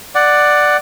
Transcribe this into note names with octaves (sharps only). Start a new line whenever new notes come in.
D5 F#5